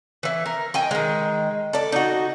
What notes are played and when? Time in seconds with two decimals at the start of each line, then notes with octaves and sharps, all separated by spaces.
0.23 E3 E4
0.46 A#4
0.74 D#5 G5 G#5
0.91 D#3 G#3
1.73 A4 D5
1.92 D#4 F#4